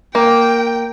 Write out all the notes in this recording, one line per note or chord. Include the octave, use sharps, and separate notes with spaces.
A#3 G5